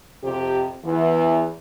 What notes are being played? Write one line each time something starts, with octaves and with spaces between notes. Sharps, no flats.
F2 C3 G4
E2 E3